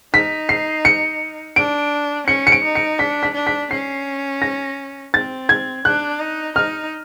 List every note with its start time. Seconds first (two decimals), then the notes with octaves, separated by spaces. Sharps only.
0.14 D#4 B6
0.49 C7
0.85 C#7
1.56 D4 D7
2.27 C#4 C#7
2.47 C#7
2.52 D7
2.64 D#4
2.75 C#7
2.99 D4 B6
3.23 B6
3.34 D4
3.47 B6
3.71 C#4 C7
4.42 A#6
5.14 C4 A6
5.49 G#6
5.85 D4 F#6
6.20 D#4
6.56 D#4 F6